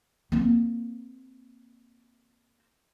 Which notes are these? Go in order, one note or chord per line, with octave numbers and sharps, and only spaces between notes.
A#3 C4